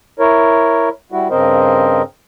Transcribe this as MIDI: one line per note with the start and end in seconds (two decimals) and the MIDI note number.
0.19 0.89 64
0.19 0.89 70
0.19 0.89 73
1.12 1.28 55
1.12 1.28 64
1.12 1.28 66
1.30 2.02 43
1.30 2.02 49
1.30 2.02 60
1.30 2.02 70
1.30 2.02 72
1.30 2.02 75